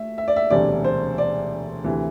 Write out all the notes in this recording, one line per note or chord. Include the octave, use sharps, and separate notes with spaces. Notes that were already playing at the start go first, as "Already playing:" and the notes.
Already playing: A3 E5
E5
D5
E5
E1 D2 C3 G3 D5
C5
D5
D2 C3 E3